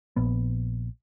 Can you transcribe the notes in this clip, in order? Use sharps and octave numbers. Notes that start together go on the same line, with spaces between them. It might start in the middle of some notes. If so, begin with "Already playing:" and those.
A#1 B3